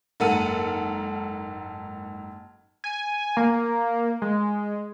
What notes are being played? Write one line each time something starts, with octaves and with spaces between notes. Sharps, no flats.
F#1 G#2 A4 A#4 F#5 D#7
G#5
A#3
G#3